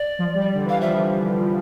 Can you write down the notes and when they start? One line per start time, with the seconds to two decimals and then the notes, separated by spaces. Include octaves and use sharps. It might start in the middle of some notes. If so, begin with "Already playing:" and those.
Already playing: D5
0.19 F3
0.35 G3
0.55 D3
0.65 E3
0.69 F5
0.81 F3 E5